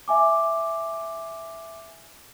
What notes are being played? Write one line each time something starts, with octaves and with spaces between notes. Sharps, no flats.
E5 G#5 D6